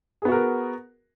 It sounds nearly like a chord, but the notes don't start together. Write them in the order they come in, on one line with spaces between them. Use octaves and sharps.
G#4 B3 F#4 A#4